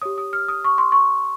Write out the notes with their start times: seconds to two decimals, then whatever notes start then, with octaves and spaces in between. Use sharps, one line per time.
0.02 G4 C#5 D#6
0.18 D#6
0.33 F6
0.48 D#6
0.64 C#6
0.78 C6
0.92 C#6